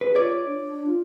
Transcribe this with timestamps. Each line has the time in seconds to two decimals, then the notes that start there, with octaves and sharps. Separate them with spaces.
0.01 G#4 B4
0.15 F4 C#5 D5
0.45 D4
0.86 F4